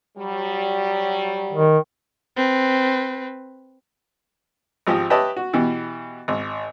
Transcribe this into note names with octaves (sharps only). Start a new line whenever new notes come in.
F#3 G3
D#3
C4 B4
G#1 F3 G4 D#5
G4 B4 C#5 D#5 E5 A5
F#4
B2 E3 G4
G#1